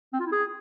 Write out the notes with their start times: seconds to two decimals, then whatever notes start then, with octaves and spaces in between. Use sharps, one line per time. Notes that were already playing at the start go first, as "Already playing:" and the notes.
0.13 C4
0.20 F4
0.26 E4
0.32 G#4